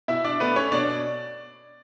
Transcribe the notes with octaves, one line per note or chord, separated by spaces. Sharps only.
B2 E4 E5
D4 D5
A3 B3 D4 B4
C#4 C#5
B2 D4 D5